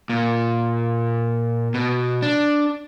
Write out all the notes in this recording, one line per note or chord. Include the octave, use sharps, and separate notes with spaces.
A#2
B2
D4